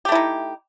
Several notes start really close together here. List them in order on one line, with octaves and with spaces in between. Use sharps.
G4 A3 E4 D#4